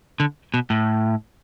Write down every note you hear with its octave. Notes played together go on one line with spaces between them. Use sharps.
D3
B2
A2